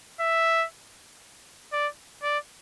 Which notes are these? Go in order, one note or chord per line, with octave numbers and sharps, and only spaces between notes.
E5
D5
D5